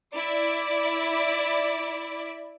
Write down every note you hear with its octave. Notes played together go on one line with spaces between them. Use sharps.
E4 D5 D7